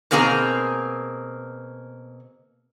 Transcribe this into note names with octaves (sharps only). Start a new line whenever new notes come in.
B2 A#3 C4 G#4 C5 A#5